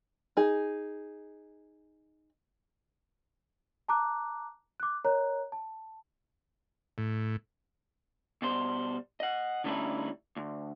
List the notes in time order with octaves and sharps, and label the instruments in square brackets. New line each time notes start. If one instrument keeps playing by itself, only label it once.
[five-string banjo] D#4 G#4
[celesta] A5 A#5 D6 F#6
D6 F#6
A#4 C#5 D#5 A#5 F#6
A5
[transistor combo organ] A2
[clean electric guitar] B2 G3 C5
D#5 F#5
D3 G3 A3 C#4 D#4 E4
D2